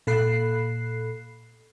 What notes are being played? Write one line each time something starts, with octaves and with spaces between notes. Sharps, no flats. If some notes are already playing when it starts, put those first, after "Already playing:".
A#2 A4 B5 F#6 C7